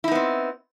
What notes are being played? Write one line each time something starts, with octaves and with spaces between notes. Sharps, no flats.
B3 C4 D#4 E4